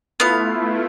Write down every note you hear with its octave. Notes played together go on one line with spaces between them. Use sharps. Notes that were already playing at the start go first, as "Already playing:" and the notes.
A3 B3 E4 F4 F5